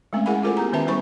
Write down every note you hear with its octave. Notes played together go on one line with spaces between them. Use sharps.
G#3 A3 C4 C#4
E4 G#4 A#4 F#5 G#5 B5
F4 A4 A#4 C5 F#5 G#5
B3 G4 A#5
D#3 B3 C#4 B4 E5 A5
G3 B3 E4 C5 B5 C#6